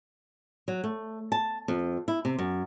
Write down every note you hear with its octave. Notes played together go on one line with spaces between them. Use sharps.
F#3
A3
A5
F2
E4
C3
F#2